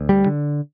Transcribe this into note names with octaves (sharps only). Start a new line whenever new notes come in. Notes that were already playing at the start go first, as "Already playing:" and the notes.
Already playing: D2
G3
D3